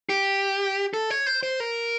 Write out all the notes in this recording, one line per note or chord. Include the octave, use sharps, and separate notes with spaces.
G4
A4
C#5
C5
C5
A#4